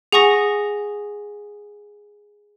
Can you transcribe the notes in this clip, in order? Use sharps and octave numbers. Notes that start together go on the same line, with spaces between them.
G#4 F#5 G#5 C#6 D#6 A#6